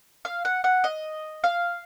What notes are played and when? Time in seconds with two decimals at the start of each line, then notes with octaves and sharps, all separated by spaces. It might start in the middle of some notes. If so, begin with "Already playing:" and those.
0.25 F5
0.45 F#5
0.64 F#5
0.84 D#5
1.44 F5